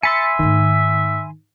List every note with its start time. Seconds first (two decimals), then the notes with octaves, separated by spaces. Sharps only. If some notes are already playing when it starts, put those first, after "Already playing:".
0.03 E5 G#5 B5 C6 E6 A6 C#7
0.39 G#2 D#3 A3